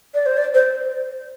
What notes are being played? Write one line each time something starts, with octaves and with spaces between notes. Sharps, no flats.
D5
C5
D5
C5